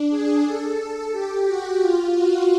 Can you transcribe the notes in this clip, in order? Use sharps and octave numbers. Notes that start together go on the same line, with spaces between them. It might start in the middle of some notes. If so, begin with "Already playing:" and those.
Already playing: D4
G#4
A4
G4
F#4
F4
F#4